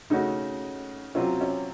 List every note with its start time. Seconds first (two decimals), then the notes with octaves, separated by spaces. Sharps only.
0.10 C#3 A3 C#4 D#4 F#4
1.15 C3 F#3 C4 C#4 F4
1.41 C#4